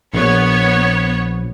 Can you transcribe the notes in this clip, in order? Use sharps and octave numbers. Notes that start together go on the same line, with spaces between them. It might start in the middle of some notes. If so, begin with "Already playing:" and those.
A#1 B3 C#5